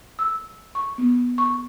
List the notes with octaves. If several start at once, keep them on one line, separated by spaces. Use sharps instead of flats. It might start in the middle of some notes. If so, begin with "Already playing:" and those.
E6
C#6
B3
C#6